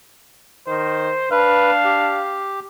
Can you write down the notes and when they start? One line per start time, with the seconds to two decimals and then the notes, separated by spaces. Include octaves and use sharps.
0.67 D#3 C5
1.31 D4 B4 F5
1.85 G4